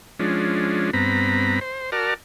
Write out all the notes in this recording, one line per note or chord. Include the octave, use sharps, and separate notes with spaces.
F3 G#3 C#4 D4
G2 B3 C4 A#5 B5
C5
F#4 A#4 D5 A5 F6